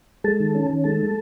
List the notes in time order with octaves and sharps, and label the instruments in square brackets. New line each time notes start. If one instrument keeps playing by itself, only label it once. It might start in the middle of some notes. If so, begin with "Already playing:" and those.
[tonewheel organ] G#3 A4 A5
D#3
C#4
D#3
G#3 A4 A5
G#3